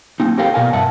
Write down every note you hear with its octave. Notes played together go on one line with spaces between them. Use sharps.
A#3 C4 D#4
G4 A4 A#4 C5 F5 G5
B2 A#4 D5 F5 G#5
G2 E5 F#5 A5